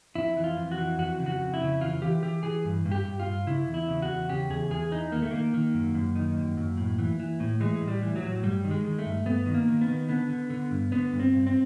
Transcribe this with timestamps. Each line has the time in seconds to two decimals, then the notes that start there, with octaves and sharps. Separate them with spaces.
0.15 F2 E4
0.37 E3
0.44 F4
0.57 F2
0.72 F#4
0.78 E3
0.99 F2 F#4
1.19 C#3
1.26 F#4
1.40 F2
1.54 E4
1.61 C#3
1.81 E3 F4
2.02 E3 G4
2.22 E3 G4
2.43 E3 G#4
2.65 G2
2.85 G2
2.92 G4
3.05 G2
3.20 F4
3.27 G2
3.47 C#3 E4
3.67 E2
3.74 E4
3.88 C#3
4.02 F#4
4.10 E2
4.29 C#3 G4
4.50 E2 G#4
4.71 E2 G#4
4.92 E3 D#4
5.12 D#3 A#3
5.22 A3
5.31 D#3 A#3
5.54 D#3
5.74 F#2
5.95 F#2
6.16 D#3
6.37 F#2
6.57 F#2
6.77 A2
6.99 E3
7.20 E3
7.40 A2
7.60 E3 G#3
7.81 A2
7.88 G3
8.03 E3
8.16 F#3
8.22 A2
8.43 G2 G3
8.64 D#3
8.71 G#3
8.85 D#3
8.99 A3
9.05 G2
9.26 G2 B3
9.46 D#3
9.54 A#3
9.68 D#3
9.81 B3
9.88 D#3
10.09 D3 B3
10.29 D3
10.50 D3
10.71 G2
10.92 D3 B3
11.13 G2
11.19 C4
11.33 G2
11.47 C4